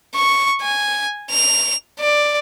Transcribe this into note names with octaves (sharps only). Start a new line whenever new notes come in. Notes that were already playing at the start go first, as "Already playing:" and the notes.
C#6
G#5
F7
D5